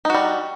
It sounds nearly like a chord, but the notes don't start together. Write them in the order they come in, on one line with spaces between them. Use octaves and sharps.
D#4 F#4 G3